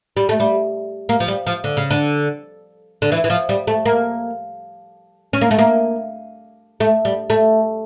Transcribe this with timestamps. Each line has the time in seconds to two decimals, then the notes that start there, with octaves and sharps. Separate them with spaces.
0.17 G3
0.29 A3
0.40 G3
1.09 A#3
1.20 F3
1.28 G3
1.47 F3
1.64 D3
1.77 C#3
1.91 D3
3.02 D3
3.12 E3
3.24 E3
3.30 F3
3.49 G3
3.67 A3
3.85 A#3
5.33 C#4
5.41 A#3
5.51 A3
5.59 A#3
6.80 A3
7.05 G3
7.30 A3